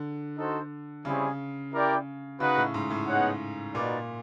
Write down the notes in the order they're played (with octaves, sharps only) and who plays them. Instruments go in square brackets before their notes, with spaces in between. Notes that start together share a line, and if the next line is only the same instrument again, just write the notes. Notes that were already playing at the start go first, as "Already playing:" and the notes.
Already playing: [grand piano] D3
[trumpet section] D#4 F#4 A4 C5
[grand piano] C#3 [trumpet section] G3 C4 E4 G#4 C#5
[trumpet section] E4 G4 A#4 D5 G5
[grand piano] C#3 [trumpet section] D#4 F#4 B4 D#5 F#5
[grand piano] A2
G#2
A2
[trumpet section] B3 D#4 G#4 C#5 F#5
[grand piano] A#2 [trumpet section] D#4 F#4 B4 D5